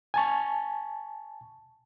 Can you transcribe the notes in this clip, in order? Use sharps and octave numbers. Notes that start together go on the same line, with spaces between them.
G#5 A5 C#6